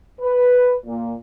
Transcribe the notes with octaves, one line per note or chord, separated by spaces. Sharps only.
B4
A#2